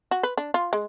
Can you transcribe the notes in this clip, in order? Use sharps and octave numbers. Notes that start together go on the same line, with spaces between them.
F#4
B4
D4
F4
G#3